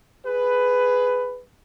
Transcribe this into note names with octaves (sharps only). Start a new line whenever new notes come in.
G#4 B4